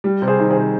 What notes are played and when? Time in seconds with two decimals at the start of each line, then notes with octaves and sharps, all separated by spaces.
0.04 G3
0.22 C3
0.27 G#4 C5
0.39 D#3
0.50 G#4 C5
0.56 C3